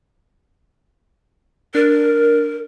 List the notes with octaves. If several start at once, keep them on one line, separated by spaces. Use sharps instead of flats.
D4 A#4